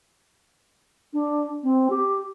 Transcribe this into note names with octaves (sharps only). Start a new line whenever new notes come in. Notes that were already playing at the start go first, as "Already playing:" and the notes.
D4
C4
G4